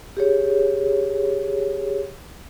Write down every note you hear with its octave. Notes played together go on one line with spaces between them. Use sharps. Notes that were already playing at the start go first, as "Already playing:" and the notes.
G4 G#4 C#5